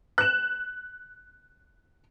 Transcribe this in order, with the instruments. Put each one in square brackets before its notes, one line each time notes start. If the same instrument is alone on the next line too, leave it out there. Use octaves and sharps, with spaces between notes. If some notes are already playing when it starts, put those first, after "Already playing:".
[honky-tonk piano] F#6 E7